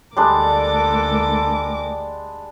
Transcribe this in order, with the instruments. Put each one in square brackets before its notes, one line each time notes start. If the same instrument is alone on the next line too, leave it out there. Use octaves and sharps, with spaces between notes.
[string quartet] D2 A#4 D6 [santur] G3 G#3 D4 [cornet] A4